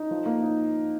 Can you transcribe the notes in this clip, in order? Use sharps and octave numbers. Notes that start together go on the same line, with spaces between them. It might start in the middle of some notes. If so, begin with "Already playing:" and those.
Already playing: D#4
F3
A#3
D#4